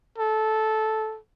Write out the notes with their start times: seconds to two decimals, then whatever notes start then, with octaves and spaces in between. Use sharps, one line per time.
0.18 A4